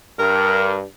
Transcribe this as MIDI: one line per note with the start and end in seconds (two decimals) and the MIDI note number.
0.19 0.83 43
0.19 0.75 70